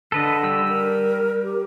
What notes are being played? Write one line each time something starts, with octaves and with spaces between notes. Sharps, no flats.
D3 A4 B4 D#5
G3 E6
A#4
G4